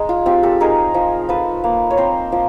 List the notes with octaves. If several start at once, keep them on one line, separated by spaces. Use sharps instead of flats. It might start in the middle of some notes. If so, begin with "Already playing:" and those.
Already playing: G#3 D#4
F4
C4 F4 G4
G4 A4
D#4 G#4 A#4
F3
F3 A4 B4
A#3
C#5
C4 A#4 C5
F3